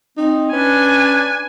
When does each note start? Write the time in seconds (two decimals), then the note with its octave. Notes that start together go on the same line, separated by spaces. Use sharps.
0.17 C4 D#4
0.53 C#4 D4 B4 G#5